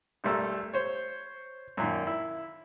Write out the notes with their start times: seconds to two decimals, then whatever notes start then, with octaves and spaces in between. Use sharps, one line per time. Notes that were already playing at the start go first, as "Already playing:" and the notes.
0.24 B1 G3 A3 A#4 E6
0.73 C5 C#5
1.77 F#2 A#2 D#3
2.07 E4